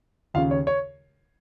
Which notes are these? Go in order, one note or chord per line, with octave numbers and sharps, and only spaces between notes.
D#2 C#3 F4 F5
C#5
C#5